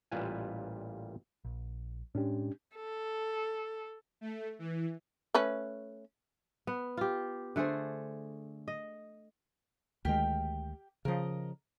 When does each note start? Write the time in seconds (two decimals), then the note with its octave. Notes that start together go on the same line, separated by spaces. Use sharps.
0.12 A1 A#2 G3 F4 B4 G#5
1.45 A#1
2.15 A2 G#3 C#4 D4 G4
2.75 A4
4.21 A3
4.59 E3
5.34 A3 C#4 B4
6.67 B3
6.97 F4 G4
7.56 D3 A3 G#4 C5
8.68 D#5
10.05 D2 D#3 G#3 G4 G5 F6
11.05 C#3 F3 A#4 D#5